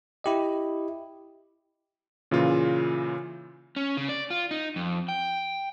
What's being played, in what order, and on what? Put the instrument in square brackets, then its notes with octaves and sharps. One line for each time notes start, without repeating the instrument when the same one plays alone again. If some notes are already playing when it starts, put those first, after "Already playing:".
[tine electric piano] E4 G4 D#5
[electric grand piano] A#2 C#3 E3 F4
[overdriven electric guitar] C#4
C#3
D5
F4
D#4
F2
G5